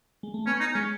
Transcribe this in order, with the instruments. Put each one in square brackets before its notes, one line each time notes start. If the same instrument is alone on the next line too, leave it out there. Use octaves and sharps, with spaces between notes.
[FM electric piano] G#3
A3
[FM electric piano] B3 [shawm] C#4
[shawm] D#4
[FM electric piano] G#3 [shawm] C#4